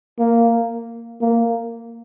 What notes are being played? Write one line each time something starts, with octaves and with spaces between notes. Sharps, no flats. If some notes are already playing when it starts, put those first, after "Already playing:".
A#3
A#3